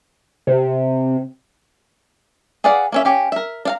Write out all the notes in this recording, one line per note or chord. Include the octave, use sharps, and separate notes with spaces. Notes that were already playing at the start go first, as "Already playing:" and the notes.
C3
G#4 B4 D5 F5 F#5
A#3 C#4 E5
C#4 G4 F5
A#4 E5
D4 F5 A#5